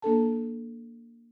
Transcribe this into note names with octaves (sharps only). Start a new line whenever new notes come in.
A#3 D4 A4 A5